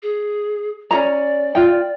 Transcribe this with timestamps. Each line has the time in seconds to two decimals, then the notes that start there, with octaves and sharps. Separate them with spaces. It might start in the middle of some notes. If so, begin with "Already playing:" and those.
0.03 G#4
0.91 C#4 G#4 D5 A#5
1.55 F4 G5